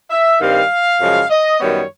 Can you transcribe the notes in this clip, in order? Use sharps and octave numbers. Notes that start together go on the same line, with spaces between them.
E5
G2 D#3 G3 C4 F5
F#2 C#3 F3 G#3
D#5
F#2 D#3 G3 B3 C#5